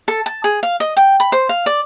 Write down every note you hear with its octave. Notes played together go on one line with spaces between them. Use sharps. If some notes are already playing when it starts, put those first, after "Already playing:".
A4
A5
G#4
F5
D#5
G5
B5
C5
F5
D5